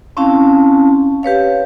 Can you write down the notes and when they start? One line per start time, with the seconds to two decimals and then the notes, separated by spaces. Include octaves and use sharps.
0.17 C4 C#4 E4 F5 A5
1.23 G4 B4 C#5 F5